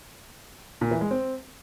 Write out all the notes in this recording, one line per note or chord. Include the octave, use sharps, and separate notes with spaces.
A#2
E3
G#3
C4